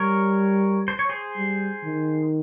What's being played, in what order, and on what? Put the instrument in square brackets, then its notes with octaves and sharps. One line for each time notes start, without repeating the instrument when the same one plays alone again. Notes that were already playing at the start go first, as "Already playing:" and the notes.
Already playing: [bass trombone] G3 [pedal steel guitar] A#4 C#5
[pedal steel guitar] C5
C#5
G#4 C5
[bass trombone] G3
D#3